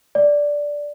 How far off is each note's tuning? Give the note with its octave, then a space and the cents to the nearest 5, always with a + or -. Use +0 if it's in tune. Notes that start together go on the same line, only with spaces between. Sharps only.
D5 -5